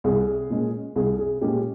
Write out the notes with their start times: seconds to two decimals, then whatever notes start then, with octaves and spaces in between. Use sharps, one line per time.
0.04 C2 G#4
0.50 A#2 G#3 C#4
0.96 C2 G#4
1.19 G#4
1.41 A#2 G#3 C#4 G4